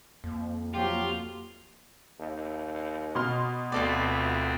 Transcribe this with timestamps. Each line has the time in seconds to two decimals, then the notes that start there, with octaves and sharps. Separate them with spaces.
0.24 F2 A#3
0.74 F3 F#3 F4 G4
2.20 D#2
3.15 B2 C6 F6
3.72 D2 B3 C4 F4 A4 D5